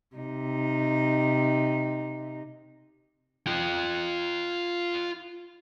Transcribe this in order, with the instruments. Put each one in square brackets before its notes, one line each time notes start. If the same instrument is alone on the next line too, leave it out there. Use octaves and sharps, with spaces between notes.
[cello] C3 D#4
[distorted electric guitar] F4 G5